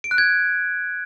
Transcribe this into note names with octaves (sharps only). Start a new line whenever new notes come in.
D7
F#6
G#6